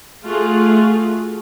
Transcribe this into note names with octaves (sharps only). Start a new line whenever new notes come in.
A3 F4 F#4 G#4